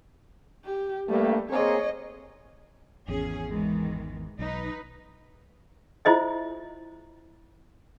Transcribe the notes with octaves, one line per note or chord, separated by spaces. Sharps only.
G4
G2 G3 A3 A#3
A#3 C4 G#4 C#5 D#5
G#1 E2 C#4 G#4
D#3 E3 G#3
B1 D#4 B4
E4 F4 C5 D#5 E5